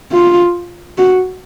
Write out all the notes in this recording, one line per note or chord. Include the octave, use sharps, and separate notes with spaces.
F4
F#4